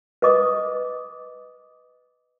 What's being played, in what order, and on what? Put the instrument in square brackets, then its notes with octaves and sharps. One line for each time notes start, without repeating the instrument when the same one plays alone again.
[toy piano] B4 D#5 D6 D#6